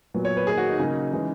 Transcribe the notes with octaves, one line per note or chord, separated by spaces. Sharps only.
A#2 F#3 B3
C#5
B4
D#3 A#3 G#4
F#4
D#4
C#3 F#3 A#3
C#3 E3 G#3